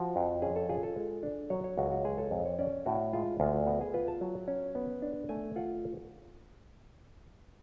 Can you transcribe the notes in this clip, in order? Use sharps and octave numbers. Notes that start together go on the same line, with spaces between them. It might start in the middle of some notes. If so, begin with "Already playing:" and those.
Already playing: F3 F#4
F2
C#4 G#4
A4
F4 G#4
A4
G#3
D4
F#3 C#5
C#5
C#2 F#4
F#4
G#3 G#4
A4
F2
C#5
C#4 D5
A2 F#4
G#3 F4
D2 F4
B3 F#4
G#4
F4 B4
A5
F#3
C#4
B3
D4
A3 G#5
F4 F#5